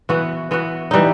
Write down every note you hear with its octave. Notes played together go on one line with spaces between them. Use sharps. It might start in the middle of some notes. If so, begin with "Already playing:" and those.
E3 B3 F#4
E3 B3 F#4
E3 G3 D#4